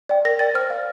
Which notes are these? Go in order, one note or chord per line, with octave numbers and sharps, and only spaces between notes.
D5 G5
A#4 A#6
D5 G5 A6
C5 F6
F5